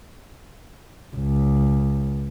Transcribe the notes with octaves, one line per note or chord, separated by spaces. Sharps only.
C#2